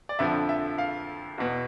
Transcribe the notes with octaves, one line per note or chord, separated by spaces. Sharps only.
D5
F2 D3 F3 E5
E5
F5
E2 B2